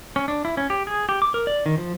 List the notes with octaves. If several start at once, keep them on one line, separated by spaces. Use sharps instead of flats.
C#4
D4
E4
C#4
G4
G#4
G4
D6
A#4
D5
D#3
F3